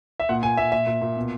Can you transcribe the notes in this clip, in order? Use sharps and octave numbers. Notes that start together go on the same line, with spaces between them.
E5
A#2 F#5
A#2 G#5
A#2 E5
A#2 E5
A#2
A#2
B2